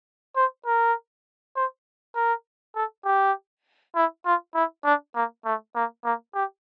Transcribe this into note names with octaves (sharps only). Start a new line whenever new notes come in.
C5
A#4
C5
A#4
A4
G4
E4
F4
E4
D4
A#3
A3
A#3
A#3
G4